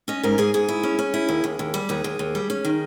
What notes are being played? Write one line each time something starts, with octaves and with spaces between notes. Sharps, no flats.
C#4 D#5
G#2 A#4
G#2 G#4
G#2 G#4
E4
C#4
C#4
E4
D#2
D#2
D#2
G3
D#2 G#4
D#2
D#2
G3
C#4
D#3